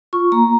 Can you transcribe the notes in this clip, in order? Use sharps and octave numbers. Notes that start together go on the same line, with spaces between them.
F4 C#6
A#3 A#5